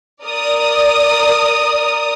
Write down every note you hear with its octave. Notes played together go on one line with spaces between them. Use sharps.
A#4 D5 D#6